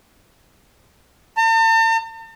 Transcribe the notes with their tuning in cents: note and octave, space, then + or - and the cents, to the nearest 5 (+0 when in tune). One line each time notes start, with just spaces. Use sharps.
A5 +45